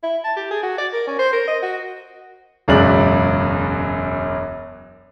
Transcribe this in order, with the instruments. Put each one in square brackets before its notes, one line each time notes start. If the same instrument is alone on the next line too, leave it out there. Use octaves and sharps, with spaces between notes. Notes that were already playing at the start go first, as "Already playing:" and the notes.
[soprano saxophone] E4
A5
G4
G#4
F#4
D5
A#4
C#4
C5
A#4
D#5
F#4
[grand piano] E1 C#2 F#2 G#3 D5 F#7